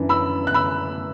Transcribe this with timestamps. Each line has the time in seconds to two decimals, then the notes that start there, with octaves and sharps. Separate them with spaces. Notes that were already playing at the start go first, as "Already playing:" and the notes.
Already playing: F#2 E3 D4
0.09 B5 E6
0.47 F#6
0.54 B5 E6